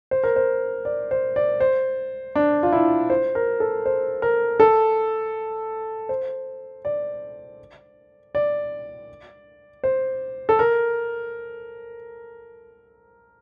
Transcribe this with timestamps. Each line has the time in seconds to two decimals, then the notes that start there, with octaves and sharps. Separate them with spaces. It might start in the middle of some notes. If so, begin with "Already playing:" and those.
0.11 C5
0.24 A#4
0.36 C5
0.85 D5
1.11 C5
1.36 D5
1.60 C5
2.35 D4
2.63 F4
2.73 E4
3.10 C5
3.35 A#4
3.60 A4
3.86 C5
4.22 A#4
4.60 A4
6.09 C5
6.85 D5
8.35 D5
9.84 C5
10.49 A4
10.59 A#4